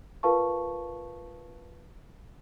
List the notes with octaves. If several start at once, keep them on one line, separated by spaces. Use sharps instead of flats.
F4 A#4 B4 F5 A5 C#6